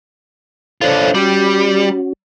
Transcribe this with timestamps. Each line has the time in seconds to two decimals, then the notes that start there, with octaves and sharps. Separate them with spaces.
0.81 D4 F4 A4 C5 C#5
1.15 G3 C#4 F#4